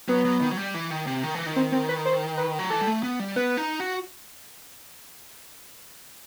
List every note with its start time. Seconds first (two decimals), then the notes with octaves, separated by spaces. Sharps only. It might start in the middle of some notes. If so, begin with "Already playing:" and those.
0.08 F#3 B3
0.25 F#3
0.41 D#3
0.52 F#3
0.57 G3
0.74 E3
0.91 D#3
1.07 C3
1.23 D#3
1.34 E3
1.46 D#3
1.56 C4
1.72 C4
1.89 B4
2.05 C5
2.37 B4
2.59 F#3
2.70 E3 A4
2.81 G3
2.87 A3
3.03 B3
3.20 G3
3.36 B3 B4
3.57 D#4
3.80 F#4